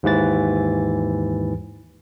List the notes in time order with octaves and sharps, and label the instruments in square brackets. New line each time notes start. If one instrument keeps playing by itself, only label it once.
[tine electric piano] D#2 G#2 E3 A6